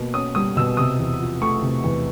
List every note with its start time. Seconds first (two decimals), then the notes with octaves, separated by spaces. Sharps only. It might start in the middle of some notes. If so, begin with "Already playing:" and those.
Already playing: B2 A#3
0.14 C#4 D#6
0.35 G3 D#6
0.57 B2 E6
0.77 C3 D#6
0.99 E2
1.20 F3
1.41 A3 C#6
1.62 C3
1.84 E2